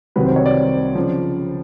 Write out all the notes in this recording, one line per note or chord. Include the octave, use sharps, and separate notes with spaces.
C2 C3 D#3 F#3 B4
C5
C#5
D5
C#3 F3